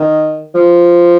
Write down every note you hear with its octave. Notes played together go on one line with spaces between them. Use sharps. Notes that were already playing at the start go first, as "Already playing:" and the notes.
Already playing: D#3
F3